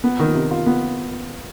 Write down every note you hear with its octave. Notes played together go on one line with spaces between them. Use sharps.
B3
D#3
C3
F4
B3